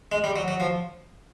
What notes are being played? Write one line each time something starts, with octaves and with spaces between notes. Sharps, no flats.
G#3
G3
F#3
F#3
F3